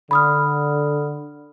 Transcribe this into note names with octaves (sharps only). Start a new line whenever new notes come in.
D3 B5 D#6 F6